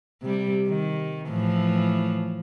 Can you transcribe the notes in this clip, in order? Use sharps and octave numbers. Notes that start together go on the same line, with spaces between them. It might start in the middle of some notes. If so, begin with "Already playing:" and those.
C3 G3
D#3
A2 E3 F3